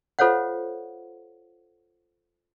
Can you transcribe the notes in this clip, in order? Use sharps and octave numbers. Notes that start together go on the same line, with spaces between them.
F4 A4 C5 C#5 F5 F#5